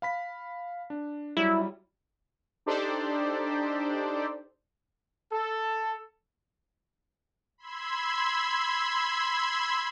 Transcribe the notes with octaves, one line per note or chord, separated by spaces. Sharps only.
F5 B5 B6
D4
F#3 G3 E4
D4 D#4 G4 A4 C5 D5
A4
B5 C6 E6 G#6